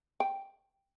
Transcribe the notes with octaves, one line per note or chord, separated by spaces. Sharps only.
G5